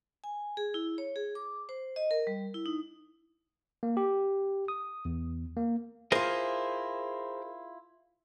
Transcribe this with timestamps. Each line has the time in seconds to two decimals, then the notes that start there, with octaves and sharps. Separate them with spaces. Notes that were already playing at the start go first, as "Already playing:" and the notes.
0.24 G#5
0.57 G#4
0.74 E4
0.98 C#5
1.16 G#4
1.35 D6
1.69 C5
1.96 D#5
2.11 A#4
2.27 G3
2.54 E4
2.66 D#4
3.83 A#3
3.97 G4
4.68 D#6
5.05 E2
5.57 A#3
6.12 E4 F4 G#4 A#4 C5